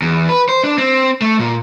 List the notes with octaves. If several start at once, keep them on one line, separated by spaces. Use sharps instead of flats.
E2
B4
C5
D4
C4
A3
A#2